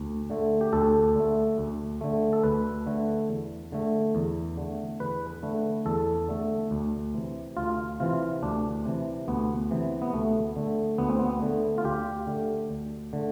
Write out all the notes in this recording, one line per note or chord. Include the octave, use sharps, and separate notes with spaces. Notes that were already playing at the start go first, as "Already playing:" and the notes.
Already playing: D2
D3 A3
G4
D2 A4
D3 A3
D2
D3 A3
A4
D2 B4
D3 A3
E2
D3 A3
E2
D3 A3
E2 B4
D3 A3
E2 A4
D3 A3
D2
C3 E3
D2 F4
C3 E3 F4
D2 D4
C3 E3
D2 B3
C3 E3
B3
D2 A3
D3 A3
D2 B3
C4
B3
D3 A3
F4
D2 G4
D3 A3
D2
D3 A3